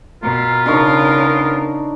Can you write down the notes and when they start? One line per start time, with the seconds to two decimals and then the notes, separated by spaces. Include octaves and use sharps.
0.23 B2 F4 A#4
0.66 C#3 B3 D4 D#4 A#4 C#6